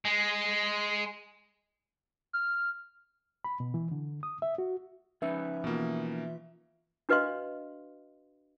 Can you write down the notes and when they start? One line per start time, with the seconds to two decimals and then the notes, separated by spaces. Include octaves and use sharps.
0.05 G#3
2.33 F6
3.44 B5
3.60 B2
3.74 E3
3.92 D3
4.23 D#6
4.42 E5
4.58 F#4
5.22 F3 C#4 D#4 B4 E5
5.64 B2 E3 A#3 F4
7.09 D4 F#4 B4 D#5 F5 C6